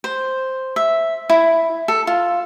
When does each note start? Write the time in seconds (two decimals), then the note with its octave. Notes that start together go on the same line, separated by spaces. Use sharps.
0.04 C5
0.76 E5
1.30 E4
1.88 A4
2.07 F4